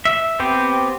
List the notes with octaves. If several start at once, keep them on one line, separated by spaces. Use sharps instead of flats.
E5
B3 C4 G4